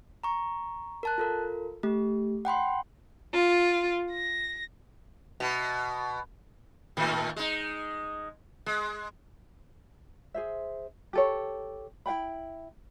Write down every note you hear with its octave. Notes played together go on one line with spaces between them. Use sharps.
A#5 C#6
A#4 A5 F#6
F4 A4 A#4
A3 G4
F#5 G5 B5 C6
F4
A#6
B2
A2 D#3 A3
G#3 D#4
G#3
G#4 C5 E5
G4 A4 C#5
E4 F5 G5 B5